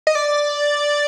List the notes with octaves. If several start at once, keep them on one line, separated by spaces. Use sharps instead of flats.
D#5
D5